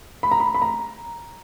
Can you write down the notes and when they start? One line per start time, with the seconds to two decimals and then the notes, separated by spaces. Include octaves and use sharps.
0.23 B5
0.32 A#5
0.40 B5
0.54 B5
0.62 A#5